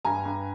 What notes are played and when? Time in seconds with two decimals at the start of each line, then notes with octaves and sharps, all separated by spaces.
0.05 G2 G#5 A#5
0.25 G2